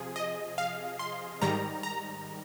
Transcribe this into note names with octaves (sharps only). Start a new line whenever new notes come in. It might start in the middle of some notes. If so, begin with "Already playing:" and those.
Already playing: C3 F3 G#4
D#5
F5
C6
G#2 D#3 G3 A#5
A#5